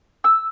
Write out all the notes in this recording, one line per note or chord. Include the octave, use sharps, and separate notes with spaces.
E6